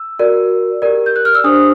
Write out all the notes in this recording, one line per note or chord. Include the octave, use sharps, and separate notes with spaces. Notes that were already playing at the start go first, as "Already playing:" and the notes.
Already playing: E6
F#4 A#4 D5
G4 A#4 D5
G6
F#6
F6
E6
D4 G4 C5 D#6